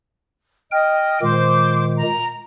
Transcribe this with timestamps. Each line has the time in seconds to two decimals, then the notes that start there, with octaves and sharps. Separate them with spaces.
0.71 D#5 G5 F6
1.22 A#2 D#3 G#3 C5 D6
1.99 A#5